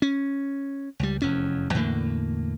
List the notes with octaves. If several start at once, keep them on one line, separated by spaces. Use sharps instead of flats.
C#4
C#2 G3
F1 E2 C#4
E2 A2 D3 A#3